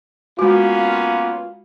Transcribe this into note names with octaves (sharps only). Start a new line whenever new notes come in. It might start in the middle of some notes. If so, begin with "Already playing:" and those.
G#3 A#3 B3 C#4 F4 F#4